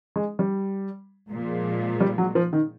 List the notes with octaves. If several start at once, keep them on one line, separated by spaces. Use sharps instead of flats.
G#3
G3
A#2 F3 G#3
G3
F#3
F3
D#3